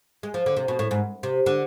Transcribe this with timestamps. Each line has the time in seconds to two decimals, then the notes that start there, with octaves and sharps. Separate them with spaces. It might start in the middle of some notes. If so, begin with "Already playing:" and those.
0.23 G#3
0.34 F3
0.46 D3
0.57 C3
0.68 B2
0.79 A2
0.91 G#2
1.23 C3
1.46 D3